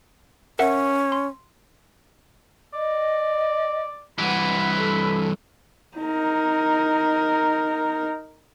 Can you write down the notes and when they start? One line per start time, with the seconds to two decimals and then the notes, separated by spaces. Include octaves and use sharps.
0.59 C#4 A#4 E5 F#5
1.12 C6
2.73 D5 D#5
4.18 G2 E3 F#5 B5
4.76 A4
5.97 D#4 A#4